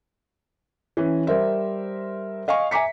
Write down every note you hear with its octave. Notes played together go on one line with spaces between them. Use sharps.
E3 C#4
G3 A#4 C5 E5
D#5 F5 G#5 C#6
E5 G#5 A#5 D6 B6 C#7